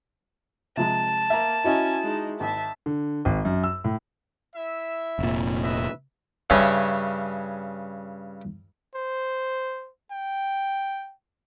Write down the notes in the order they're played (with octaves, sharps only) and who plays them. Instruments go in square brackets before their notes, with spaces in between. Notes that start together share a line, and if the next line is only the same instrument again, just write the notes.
[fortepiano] C3 F3 G#3 [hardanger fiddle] A5
[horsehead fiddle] A#3 [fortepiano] E5 A#5
[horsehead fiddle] C#4 G#5 [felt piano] E4 F#4 D#5
[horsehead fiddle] G#3 D#4
[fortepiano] G#1 [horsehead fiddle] E5 A5
[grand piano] D3
G#1
F#2
E6
A2
[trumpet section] E4 E5
[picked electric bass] F1 A#2
[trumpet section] B4 D#5 E5
[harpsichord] G2 C#3 C#4 C#5 E5 G#5
[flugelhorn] C5
G5